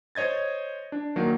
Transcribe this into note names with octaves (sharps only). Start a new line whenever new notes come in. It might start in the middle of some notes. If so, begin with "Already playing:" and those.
C5 C#5 D#5 G#6 A6
D4
D#3 F#3 A#3